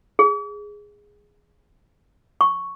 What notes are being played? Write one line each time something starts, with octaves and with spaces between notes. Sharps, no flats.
G#4
C#6